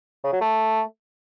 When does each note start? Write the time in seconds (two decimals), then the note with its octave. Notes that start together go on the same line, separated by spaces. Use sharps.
0.24 C#3
0.33 F#3
0.41 A3